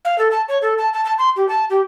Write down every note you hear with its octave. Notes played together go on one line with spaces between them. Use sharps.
F5
A4
A5
C#5
A4
A5
A5
A5
C6
G4
A5
G4